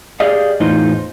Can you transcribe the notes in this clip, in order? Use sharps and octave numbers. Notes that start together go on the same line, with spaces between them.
G4 G#4 D5 D#5 F5
E2 A2 D#4 F4 C5